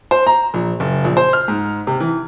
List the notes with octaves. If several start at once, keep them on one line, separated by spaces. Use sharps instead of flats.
C5
A#5
A#1
F#1
A#1
C5
F6
G#2
C3
E3